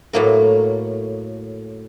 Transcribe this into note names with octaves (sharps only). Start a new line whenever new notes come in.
A2 F#3 A#3 A#4